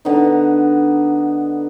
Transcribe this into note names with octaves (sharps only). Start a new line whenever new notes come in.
D3 B3 D#4